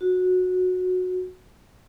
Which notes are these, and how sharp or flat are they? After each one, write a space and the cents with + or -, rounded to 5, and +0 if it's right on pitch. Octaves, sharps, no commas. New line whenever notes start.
F#4 -15